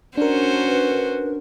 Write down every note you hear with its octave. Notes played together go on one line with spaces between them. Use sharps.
C#4 D4 F#4 A#4 C5
B4